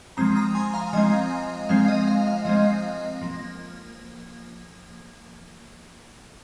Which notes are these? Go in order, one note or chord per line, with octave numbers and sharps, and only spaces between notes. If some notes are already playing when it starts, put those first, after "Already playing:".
F3 G#3 C4 A#5 D#6
A#5 D#6
G#5 C6
F5 A#5
F3 G#3 C4 D#5 G#5
F3 G#3 C4 F5
D#5
F5
F5
F3 G#3 C4 D#5
F3 A#3